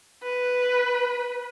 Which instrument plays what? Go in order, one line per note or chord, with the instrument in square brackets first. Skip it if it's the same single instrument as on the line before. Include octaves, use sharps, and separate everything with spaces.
[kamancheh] B4